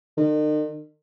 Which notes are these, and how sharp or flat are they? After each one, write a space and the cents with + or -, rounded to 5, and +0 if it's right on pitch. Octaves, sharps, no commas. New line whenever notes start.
D#3 -40